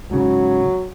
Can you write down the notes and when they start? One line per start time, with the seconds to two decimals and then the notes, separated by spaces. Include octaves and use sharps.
0.11 G#2 C#3 F#3